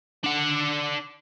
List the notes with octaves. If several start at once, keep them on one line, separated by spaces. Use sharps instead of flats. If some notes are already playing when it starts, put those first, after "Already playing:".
D4 F#5